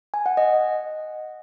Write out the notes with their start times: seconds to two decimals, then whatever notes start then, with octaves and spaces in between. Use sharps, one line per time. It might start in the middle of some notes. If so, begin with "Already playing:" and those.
0.14 G#5
0.26 F#5
0.37 D#5